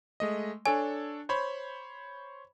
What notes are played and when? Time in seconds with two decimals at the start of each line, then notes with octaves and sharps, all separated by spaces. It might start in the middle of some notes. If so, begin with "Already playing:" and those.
0.20 G#3 A3 D#5
0.66 D4 A4 C#5 G#5
1.29 C5 C#5 B5